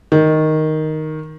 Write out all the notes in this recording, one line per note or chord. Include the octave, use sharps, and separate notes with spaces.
D#3